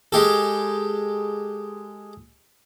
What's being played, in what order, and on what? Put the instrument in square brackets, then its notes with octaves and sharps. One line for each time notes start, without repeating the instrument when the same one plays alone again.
[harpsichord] G#3 G4 A4